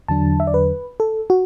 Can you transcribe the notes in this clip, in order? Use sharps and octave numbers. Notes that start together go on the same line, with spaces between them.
E2 D3 F#3 D4 A5
E5
D5
B4
A4
F#4